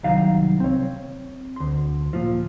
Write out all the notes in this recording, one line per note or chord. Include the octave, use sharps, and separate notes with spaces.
C2 D#3 F#3 F5 A#5
C4 C#5
D2 C6
A#2 F3